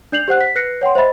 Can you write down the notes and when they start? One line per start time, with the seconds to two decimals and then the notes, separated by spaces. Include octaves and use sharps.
0.12 D4 D5 G6 C7 F7 F#7
0.28 G4 C5 F#5 F#6
0.41 B6
0.55 B4 F#6 A#6 C7 C#7
0.81 C#5 F#5 G5 C6
0.95 C5 D#5 E5 B5 A6